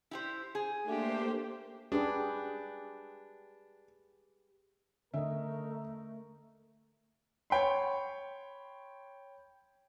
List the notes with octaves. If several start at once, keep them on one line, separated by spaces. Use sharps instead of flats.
E4 G4 C5
G#4
A3 A#3 D4 G4 C5
D4 G4 G#4 B4
D3 A3 C#4 A#4 D#5 E5
C#5 G5 B5 C6